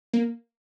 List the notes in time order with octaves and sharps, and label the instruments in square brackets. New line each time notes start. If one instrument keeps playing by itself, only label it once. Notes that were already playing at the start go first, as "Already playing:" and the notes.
[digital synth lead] A#3